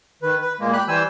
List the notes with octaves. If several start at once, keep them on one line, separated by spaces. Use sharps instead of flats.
D#3 B4
B4
A#2 G#3 A#3
G4 B5 F#6
E3 G3 C5 G#5 E6